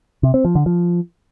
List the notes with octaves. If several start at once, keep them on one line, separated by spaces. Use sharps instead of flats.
C3
C4
F3
D3
F3